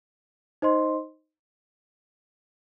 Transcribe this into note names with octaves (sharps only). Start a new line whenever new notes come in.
D#4 C5 D#5 C6